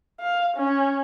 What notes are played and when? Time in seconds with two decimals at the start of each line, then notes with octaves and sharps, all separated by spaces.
0.20 F5
0.57 C#4